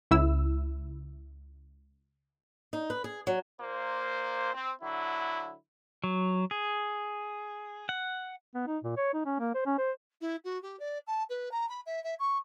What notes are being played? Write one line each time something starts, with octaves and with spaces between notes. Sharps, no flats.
C#2 E4 E6
D#4
B4
G#4
F#3
A#2 A#3 C5
C4
D3 F#3 E4
F#3
G#4
F#5
B3
D#4
A#2
C#5
D#4
C#4
A#3
C5
C#4
C5
E4
F#4
G4
D5
A5
B4
A#5
B5
E5
E5
C#6